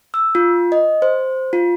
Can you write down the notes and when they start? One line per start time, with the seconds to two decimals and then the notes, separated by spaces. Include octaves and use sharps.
0.14 E6
0.35 F4
0.72 D#5
1.02 C5
1.53 F4